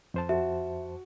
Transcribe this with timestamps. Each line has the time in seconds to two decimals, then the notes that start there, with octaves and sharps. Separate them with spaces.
0.14 F2 C5 A5
0.29 F#4 E5